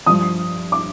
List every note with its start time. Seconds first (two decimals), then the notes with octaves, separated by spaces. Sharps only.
0.06 G2 F3 D#6
0.72 D6